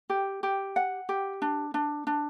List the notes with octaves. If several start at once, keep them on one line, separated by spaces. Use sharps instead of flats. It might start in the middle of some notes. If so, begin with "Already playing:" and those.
G4
G4
F#5
G4
D4
D4
D4